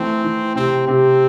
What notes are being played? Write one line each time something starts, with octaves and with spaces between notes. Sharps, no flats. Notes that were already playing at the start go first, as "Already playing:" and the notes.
Already playing: E3 A3 C4
E3
C3 C4
C3 C4